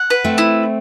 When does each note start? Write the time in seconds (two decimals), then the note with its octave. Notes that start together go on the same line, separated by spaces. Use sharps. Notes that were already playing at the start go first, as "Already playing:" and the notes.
Already playing: F#5
0.10 B4
0.24 A3 C4
0.38 E4